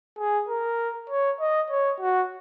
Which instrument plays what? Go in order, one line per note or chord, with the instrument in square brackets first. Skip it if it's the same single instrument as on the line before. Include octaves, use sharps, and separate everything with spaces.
[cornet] G#4
A#4
C#5
D#5
C#5
F#4